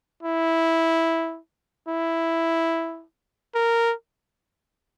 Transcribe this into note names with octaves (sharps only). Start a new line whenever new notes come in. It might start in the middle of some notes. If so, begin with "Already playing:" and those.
E4
E4
A#4